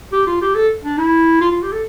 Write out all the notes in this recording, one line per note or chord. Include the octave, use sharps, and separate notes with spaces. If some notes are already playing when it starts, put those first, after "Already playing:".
G4
F4
G4
A4
D4
E4
F4
F4
G4
A4